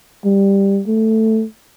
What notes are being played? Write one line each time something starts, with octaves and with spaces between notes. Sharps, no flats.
G3
A3